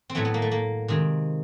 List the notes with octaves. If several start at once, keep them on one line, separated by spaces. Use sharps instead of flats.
C4
A2 F#3 A3 B3
B3
A#3
A3
A#3
C3 D#3 G#3